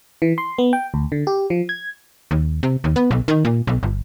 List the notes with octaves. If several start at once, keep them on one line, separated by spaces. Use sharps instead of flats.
E3
C6
B3
G5
D2
D3
G4
F3
G#6
D#2
C3
D#2
B3
B1
D#3
A#2
B1
G1